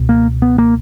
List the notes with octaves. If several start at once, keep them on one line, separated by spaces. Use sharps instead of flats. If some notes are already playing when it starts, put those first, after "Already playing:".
Already playing: C#2 B2
A#3
B3
A#3